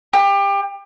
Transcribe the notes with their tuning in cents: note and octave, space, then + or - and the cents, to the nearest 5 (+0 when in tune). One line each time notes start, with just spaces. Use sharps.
G4 +25